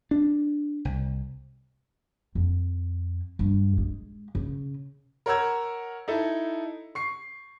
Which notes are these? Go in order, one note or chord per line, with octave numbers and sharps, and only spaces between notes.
D4
C2
F2
G2
G#3
C#3
A#4 C#5 F#5 A#5 E6 G#6
D#4 E4 A4
C#6 C7